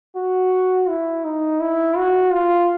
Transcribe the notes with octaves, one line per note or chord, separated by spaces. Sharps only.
F#4
E4
D#4
E4
F#4
F4